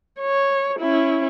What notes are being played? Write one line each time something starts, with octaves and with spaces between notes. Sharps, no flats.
C#5
C#4 E4